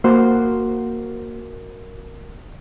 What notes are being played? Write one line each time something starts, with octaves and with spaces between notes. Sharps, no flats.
A#3 F#4 C5